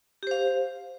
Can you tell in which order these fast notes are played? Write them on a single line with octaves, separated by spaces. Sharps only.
G4 C5 F5